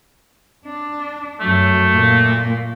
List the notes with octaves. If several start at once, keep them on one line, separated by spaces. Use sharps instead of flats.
D4
F#2 F#3 A3
A#2 A#3